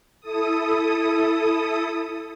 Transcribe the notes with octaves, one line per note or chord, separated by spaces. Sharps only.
E4 A4 D#6